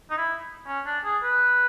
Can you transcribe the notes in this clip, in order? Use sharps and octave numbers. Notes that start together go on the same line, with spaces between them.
D#4
E4
C#4
D4
G#4
B4